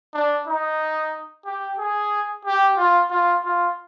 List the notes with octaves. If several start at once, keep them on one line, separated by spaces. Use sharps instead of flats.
D4
D#4
G4
G#4
G4
F4
F4
F4